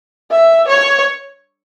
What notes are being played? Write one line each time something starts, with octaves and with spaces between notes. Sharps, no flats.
E5
C#5